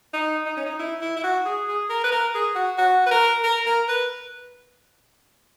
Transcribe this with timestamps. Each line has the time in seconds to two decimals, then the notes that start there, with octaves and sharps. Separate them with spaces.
0.13 D#4
0.46 D#4
0.57 C#4
0.66 D#4
0.79 E4
1.01 E4
1.16 E4
1.24 F#4
1.45 G#4
1.68 G#4
1.90 A#4
2.04 B4
2.12 A#4
2.34 G#4
2.55 F#4
2.78 F#4
3.06 B4
3.11 A#4
3.44 A#4
3.66 A#4
3.88 B4